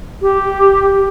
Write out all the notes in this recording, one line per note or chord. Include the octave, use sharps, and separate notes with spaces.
G4